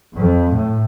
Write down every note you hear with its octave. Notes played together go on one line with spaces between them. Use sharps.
F2
A2